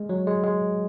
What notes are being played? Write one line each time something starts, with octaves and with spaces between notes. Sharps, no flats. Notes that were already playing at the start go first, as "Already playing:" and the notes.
Already playing: G#3
F#3
G#3
G#3